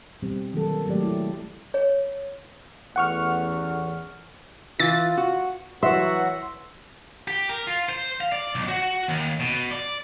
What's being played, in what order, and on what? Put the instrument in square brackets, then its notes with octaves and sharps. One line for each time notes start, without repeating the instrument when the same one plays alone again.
[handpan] B2 G3 C4
D#3 F3 F#3 A#3 C4 A4
F#3 G#3 A3 G4 D5
E4 A4
[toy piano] C#5
[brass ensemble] A1 E2 [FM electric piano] F#5 C#6 F6
[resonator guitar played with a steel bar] E3 [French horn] F4 [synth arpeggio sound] A6
[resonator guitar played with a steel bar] F#4
[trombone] E3 [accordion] F#3 F#4 F#5 [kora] E5 [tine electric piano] C6
[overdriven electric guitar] G4
A#4
F4
C5
F5
D5
B1
F#4
D#2
B2
D5